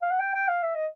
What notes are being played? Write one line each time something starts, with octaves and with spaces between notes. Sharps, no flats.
F5
F#5
G5
G5
F5
E5
D#5